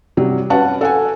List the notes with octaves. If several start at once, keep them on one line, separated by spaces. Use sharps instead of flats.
C3 F#3 G3
C#4 F#4 B4 F#5 A5
A4 F#5 G#5